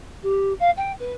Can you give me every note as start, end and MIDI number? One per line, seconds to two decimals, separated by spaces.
0.22 0.52 67
0.59 0.70 77
0.76 0.91 79
0.99 1.12 71